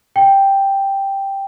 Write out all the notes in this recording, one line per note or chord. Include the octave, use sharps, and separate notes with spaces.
G5